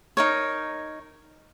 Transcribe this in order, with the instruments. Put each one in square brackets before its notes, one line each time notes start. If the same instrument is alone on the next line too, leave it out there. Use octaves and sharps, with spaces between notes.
[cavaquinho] D#4 A#4 C#5